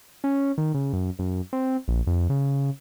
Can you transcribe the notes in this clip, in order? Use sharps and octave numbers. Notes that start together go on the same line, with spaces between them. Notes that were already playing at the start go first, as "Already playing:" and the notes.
C#4
D#3
C#3
F#2
F#2
C4
A#1
F2
C#3